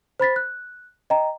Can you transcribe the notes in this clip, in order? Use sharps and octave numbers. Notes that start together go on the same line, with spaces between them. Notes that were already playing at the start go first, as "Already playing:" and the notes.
C5 B5 A6 B6
F#6
D#5 G5 A#5